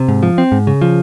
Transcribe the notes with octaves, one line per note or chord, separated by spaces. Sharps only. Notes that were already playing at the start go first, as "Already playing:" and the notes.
Already playing: C3
G#2
F3
C4
G#2
C#3
F3